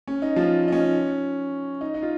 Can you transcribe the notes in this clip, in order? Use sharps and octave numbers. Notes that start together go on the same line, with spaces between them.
C#4
D#4
F3 F4
D#4
C#4
D#4
D#4
F4